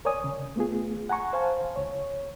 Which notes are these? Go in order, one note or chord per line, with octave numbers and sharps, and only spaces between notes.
A#4 C#5 D5 G#5 D#6
C#3
A3 B3 F4 G#4
F#5 G#5 A#5 C#6
C5 F5 G#5 A5
C#2 C#5